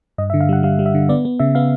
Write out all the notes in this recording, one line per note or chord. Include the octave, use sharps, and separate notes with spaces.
G2 D#5
E5
D3
F5
G3 F#5
G3 F5
G3
E5
D3
B3 D5
B3
C#3 E5
B3 F5